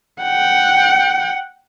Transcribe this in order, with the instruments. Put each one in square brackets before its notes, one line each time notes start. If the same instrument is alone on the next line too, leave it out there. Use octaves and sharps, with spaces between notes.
[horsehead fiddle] F#5 G5